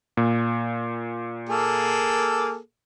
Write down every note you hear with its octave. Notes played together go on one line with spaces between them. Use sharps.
A#2
A#3 G#4 A4